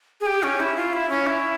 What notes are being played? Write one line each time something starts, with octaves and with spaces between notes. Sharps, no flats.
G#4
G4
C#4
E4
F4
E4
C#4
E4